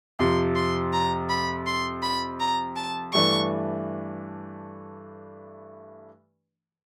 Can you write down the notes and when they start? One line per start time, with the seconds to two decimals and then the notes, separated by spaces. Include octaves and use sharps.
0.19 F2 C3 F3 C6
0.56 C6
0.93 A#5
1.30 B5
1.67 C6
2.03 B5
2.40 A#5
2.76 A5
3.13 G2 E3 A3 D4 C#6